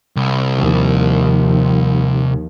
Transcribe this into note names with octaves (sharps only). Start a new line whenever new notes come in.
C2
D#2 F3